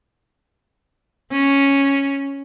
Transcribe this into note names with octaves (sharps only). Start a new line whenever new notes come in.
C#4